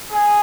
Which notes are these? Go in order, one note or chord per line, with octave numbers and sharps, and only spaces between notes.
G#4